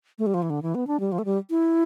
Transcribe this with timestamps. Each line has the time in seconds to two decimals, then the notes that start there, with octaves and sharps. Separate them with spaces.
0.18 A3
0.26 G3
0.34 F3
0.42 E3
0.50 D3
0.62 E3
0.75 B3
0.87 D4
1.00 G3
1.12 F3
1.19 A3
1.25 G3
1.50 E4